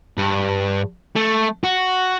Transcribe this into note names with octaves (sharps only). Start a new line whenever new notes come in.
G2
A3
F#4